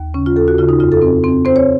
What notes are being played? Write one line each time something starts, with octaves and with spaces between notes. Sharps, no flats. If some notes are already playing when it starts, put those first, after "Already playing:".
Already playing: D#2
C#3 C#4
F4
D#2 A4
F#4
C#3 F4
D#4
F2 F4
A4
C4
C4
C4 C5
C#5